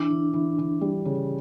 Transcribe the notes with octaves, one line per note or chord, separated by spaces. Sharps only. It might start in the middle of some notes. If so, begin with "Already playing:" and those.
Already playing: E3 D4
E3
E3
E3
G3
C#3